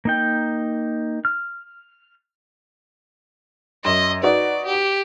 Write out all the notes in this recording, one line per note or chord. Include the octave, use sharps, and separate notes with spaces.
A#3 D#4 G5
F6
F#2 D#5 C6 E7
D#4 F#4 B4 D5
G4